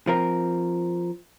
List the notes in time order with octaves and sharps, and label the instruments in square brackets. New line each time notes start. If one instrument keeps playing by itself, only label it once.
[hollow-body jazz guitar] F3 C4 A#4